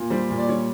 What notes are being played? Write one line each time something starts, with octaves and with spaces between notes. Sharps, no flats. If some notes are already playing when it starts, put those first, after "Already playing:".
Already playing: A#2
G3 C5
A#2
D5
G3 C#5